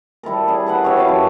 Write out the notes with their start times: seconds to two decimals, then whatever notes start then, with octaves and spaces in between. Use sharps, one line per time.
0.23 G3 E4 A4 A#4
0.48 D4 G#4
0.66 G#4 B4 F#5
0.84 F#4 G4 C#5 E5
0.97 E4 F5 A5
1.08 F#2